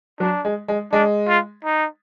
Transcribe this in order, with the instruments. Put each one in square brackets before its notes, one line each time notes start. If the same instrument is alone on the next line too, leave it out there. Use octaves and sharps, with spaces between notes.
[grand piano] F#3 [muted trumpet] D4
[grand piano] G#3
G#3
[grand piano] G#3 [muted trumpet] D4
[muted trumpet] F4
D#4